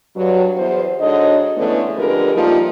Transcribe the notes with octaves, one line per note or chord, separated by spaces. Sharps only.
G2 F#3
E2 C5
G#2 D3 F#4 C#5 D#5
D3 E3 G#3 A3 B3 C#4
F2 D3 G#3 G4 A#4 B4
F3 G3 A3 A#3 D#4 F4